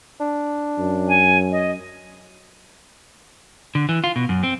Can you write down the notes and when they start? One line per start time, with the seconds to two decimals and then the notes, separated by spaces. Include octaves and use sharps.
0.20 D4
0.78 F#2
1.09 G#5
1.52 D#5
3.75 D3
3.89 E3
4.04 F4
4.16 B2
4.29 F#2
4.43 C4